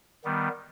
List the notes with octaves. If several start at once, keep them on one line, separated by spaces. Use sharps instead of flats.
D#3 G3 B3